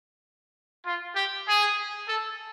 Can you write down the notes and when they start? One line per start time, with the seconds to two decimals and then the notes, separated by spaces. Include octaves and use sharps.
0.85 F4
1.16 G4
1.47 G#4
2.07 A4